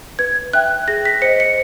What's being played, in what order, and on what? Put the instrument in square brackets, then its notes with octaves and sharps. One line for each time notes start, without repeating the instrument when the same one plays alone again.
[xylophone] B4 G#6
E5 G5 F#6
G#4 A#6
B6
C5 D#5 C#7
C#7